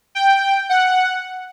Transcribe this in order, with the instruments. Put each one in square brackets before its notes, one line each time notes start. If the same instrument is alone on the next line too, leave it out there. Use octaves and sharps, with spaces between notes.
[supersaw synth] G5
F#5